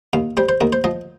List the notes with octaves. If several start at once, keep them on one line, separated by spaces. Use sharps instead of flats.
D#2 F5
G3 C5
C5
D#2 A#4
C5
F3 D#5